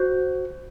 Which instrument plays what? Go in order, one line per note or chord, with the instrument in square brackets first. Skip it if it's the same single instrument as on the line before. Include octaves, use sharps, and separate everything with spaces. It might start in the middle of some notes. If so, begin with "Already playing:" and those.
Already playing: [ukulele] F#4 C5